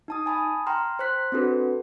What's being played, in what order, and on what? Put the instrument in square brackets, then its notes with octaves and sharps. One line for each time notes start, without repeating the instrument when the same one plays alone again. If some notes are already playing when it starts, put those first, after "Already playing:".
[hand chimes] D#4 A5 D#6
G#5 A5 B5 D#6
G5 A#5 C6 F6
C5 C6 F#6 B6
C4 D4 F#4 A4 B4